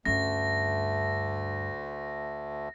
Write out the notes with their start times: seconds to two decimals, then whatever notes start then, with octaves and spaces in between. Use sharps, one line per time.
0.05 D2 G2 A3 C#4 A#6